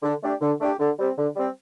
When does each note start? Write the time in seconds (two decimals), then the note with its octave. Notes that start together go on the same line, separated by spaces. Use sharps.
0.03 D3
0.22 A3 D4 G4
0.41 D3
0.60 A3 D4 G4
0.79 D3
0.98 G3 C4
1.17 D3
1.36 G3 C4